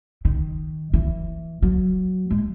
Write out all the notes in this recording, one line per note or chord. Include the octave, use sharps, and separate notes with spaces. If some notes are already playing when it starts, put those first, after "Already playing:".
D#3
E3
F#3
G#3